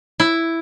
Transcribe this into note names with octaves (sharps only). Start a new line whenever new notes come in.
E4